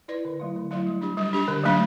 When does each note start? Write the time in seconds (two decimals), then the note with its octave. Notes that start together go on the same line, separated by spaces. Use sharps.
0.08 E4 B4 D5
0.25 D3
0.40 F#3 A3 E4
0.56 D3
0.71 F#3 A3 E4
0.87 G3
1.01 D4 G4
1.17 G3
1.33 D4 G4
1.48 D3
1.64 F#3 A3 D4